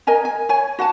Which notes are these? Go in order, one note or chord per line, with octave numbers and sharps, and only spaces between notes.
A#4 D#5 G#5 A#5
G#5
C#5 G#5
F#4 F#5 G#5 A5